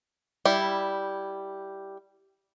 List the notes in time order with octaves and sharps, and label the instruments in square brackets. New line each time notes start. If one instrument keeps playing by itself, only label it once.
[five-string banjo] G3 E4